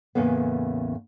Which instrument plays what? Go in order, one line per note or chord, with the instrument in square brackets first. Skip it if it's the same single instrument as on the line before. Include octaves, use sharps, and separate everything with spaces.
[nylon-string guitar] E2 A2 C#3 A#3 B3